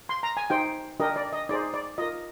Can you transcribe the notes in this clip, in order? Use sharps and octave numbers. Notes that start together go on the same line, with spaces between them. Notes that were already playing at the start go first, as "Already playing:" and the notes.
C6
A#5
G#5
D#4 G4 C5 G5
D4 G4 A#4 D#5
D5
D#5
D#4 G#4 C5 D5
D5
F4 A#4 D#5